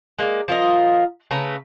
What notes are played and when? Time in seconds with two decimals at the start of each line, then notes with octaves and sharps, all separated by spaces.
0.19 G#3 A#3 C#5 D5
0.48 F3 F4 A#4 D#5
1.31 C#3 A3 B4 A#5